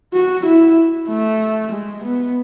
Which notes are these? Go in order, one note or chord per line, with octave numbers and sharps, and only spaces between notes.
F#4
E4
A3
G#3
B3